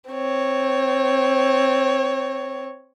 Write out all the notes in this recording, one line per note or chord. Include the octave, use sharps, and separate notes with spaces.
C4 C#5